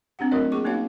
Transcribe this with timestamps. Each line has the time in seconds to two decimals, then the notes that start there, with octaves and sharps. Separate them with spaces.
0.19 C4 D4 G4 F#5
0.31 F#3 A3 F4 A#4 C#5 D#5
0.52 A#3 G#4 C#6 D6
0.65 A#3 C#4 D#4 F#4 C#5 F5